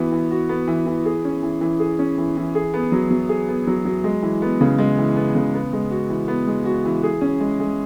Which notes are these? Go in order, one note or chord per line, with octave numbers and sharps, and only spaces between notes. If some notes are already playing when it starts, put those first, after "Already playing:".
Already playing: E3 B3 F#4
E3
F#4
B3
E3
E3
G#4
C#4
E3
E3
G#4
C#4
E3
E3
G#4
B3
F#3
F#3
G#4
B3
F#3
F#3
G#3
E3
B3
C#3
G#3
E3
B3
C#3
B3
G#3
F#4
E3
B3
G#3
F#4
E3
G#4
C#4
G#3
G#3